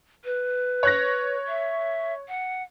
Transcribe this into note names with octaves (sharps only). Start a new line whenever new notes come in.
B4
C#5 F#6 A#6
E5
F#5